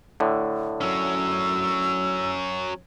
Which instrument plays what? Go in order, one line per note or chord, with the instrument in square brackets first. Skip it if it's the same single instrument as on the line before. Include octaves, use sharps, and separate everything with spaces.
[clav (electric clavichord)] A2 D3
[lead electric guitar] F#3 C#4 [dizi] E6